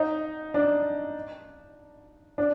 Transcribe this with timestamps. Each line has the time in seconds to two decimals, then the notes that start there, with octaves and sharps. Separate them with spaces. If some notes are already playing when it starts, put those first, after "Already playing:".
Already playing: D#4
0.54 D4
2.38 D4